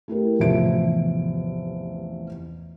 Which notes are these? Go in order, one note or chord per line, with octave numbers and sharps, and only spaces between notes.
A3 E4 G4 A#4
A1 E2 C3 F3 E5 D7